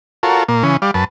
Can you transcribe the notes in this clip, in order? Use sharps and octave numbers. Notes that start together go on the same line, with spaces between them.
F4 F#4 A4 A#4 C#5
A#2 A#3
C#3 E3 C#4
G3 D5 F5
F#2 B4 A5